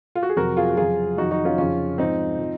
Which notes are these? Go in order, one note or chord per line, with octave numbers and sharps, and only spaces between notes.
F4
F#4
G#4
F2 C3 F#3 F#4 A#4
F4 G#4
F#4
F2 C#3 F#3 F4 G#4
F2 D#3 F#3 D#4 F#4
D#4 F#4
C#4 F4
F2 C#3 F3 C#4 F4
G#2 F3 C4 D#4
F3